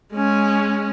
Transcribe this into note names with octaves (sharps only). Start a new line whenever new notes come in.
G#3 C#4